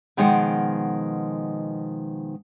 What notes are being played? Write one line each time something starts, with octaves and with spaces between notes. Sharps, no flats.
B2 D#3 F3 G#3 F#5 G5